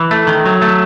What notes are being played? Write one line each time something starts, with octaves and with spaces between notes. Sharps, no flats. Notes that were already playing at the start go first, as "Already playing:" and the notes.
Already playing: E3
A3
D#3
F#3
A3